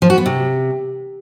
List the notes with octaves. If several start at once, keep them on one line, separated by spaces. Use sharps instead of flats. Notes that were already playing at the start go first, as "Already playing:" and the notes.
F3
F#4
B3
C3